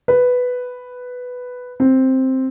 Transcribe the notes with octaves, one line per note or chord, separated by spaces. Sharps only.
B4
C4